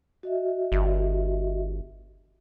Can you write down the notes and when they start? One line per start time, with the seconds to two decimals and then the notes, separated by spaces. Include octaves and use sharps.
0.23 F#4 D#5 E5
0.72 G1